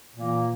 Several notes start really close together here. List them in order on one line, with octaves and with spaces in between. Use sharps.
A#2 E3 A#3